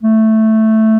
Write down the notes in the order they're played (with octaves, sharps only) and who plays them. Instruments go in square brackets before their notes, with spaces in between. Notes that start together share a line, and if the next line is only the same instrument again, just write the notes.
[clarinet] A3